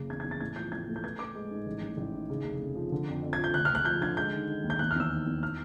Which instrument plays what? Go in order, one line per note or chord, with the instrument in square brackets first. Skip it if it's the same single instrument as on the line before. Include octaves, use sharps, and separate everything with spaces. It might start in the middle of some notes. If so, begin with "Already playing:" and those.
Already playing: [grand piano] F#1 C#3
E2 G#6
G#6
E2
A6
A2 G#6
F3 G6
A2 G#6
A3
G6
B3 G#6
B3 D6
G#3
G#2
A1
A1
A1
D#3
C#3
F1
F1
F3
D3
F2
F2
G#6
F3
G6
D2 F#6
D2 F6
F#6
F3 G6
D3 G#6
G#3 G6
D#3
D#3
D#2
G6
E2 F#6
F6
E2 E6
D#3
E2
F6